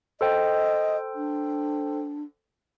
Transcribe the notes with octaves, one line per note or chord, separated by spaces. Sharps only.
A4 C5 D#5 G5
D4